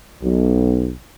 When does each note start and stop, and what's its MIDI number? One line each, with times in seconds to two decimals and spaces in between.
0.22 0.91 35